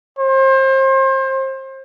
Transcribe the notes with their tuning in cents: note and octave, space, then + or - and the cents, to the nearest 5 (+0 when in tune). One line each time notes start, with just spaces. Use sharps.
C5 +30